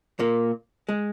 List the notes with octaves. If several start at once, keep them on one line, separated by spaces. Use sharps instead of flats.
A#2 A#3
G#3